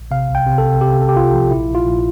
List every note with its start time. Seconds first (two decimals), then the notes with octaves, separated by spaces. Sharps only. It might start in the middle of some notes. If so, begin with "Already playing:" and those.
Already playing: A#1
0.11 C3 F5
0.29 C2
0.35 G5
0.46 C3
0.58 A4
0.64 C3
0.81 C3 G4
0.99 C3 A4
1.09 G4
1.16 C2 F4
1.34 F3
1.51 A#1 E4
1.69 A#1
1.75 F4
1.86 A#1